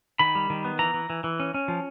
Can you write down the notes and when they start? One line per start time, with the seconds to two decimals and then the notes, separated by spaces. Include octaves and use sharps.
0.19 D#3 B5
0.35 G3
0.50 D#3
0.65 B3
0.79 E3 A#5
0.94 E3
1.10 E3
1.24 E3
1.40 C#4
1.54 C#4
1.68 F3